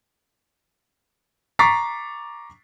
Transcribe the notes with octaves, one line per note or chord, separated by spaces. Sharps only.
A#5 C#6 D6 A6 B6 C7